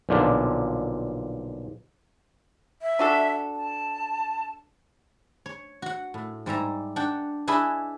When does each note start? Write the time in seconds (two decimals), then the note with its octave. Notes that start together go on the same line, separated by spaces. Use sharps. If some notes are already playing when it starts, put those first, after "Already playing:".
0.09 B1 A#2 D3 F3
2.82 E5
2.99 D4 F#4 A4
3.54 A5
5.46 C#5
5.82 F#4 F#5
6.14 A2
6.46 G#2 G3 E5 A#5
6.96 D4 F#5 G5
7.47 D4 E4 G#4 B4 D#5